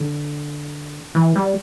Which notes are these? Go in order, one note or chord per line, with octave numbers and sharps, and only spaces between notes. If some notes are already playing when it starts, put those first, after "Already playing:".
Already playing: D3
E3
G3